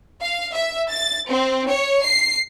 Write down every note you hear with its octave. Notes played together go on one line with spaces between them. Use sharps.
F5
E5
A6
C4
C#5
C7